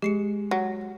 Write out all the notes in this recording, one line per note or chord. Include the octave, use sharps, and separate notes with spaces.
G#3 G4 C7 C#7
F#3